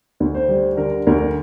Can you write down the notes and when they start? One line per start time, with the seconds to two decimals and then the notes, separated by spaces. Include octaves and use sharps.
0.20 D2
0.35 C5
0.49 G3
0.77 D3 A#4
1.07 D2 A#4